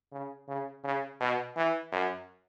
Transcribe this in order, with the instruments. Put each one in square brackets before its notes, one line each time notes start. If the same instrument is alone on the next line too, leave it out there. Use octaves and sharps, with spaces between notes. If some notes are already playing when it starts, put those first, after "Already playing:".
[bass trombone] C#3
C#3
C#3
B2
E3
F#2